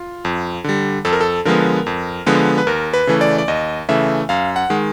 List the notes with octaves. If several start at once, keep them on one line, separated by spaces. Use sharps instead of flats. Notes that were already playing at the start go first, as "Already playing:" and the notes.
Already playing: F4
F2
D3 G3
F2 A4
A#4
A4
D3 F3 G#3 B3 A#4
F2
D3 F3 G#3 B3
B4
D#2 A#4
B4
C#3 E3 A3
D5
D5
D#2 D#5
C#3 E3 A3 E5
F#2 F5
F#5
D#3 G#3